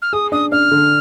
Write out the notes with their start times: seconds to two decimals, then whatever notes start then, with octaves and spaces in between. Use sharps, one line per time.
0.02 F6
0.13 G#4 D#6
0.32 D4 D#6
0.52 D4 F6
0.71 D3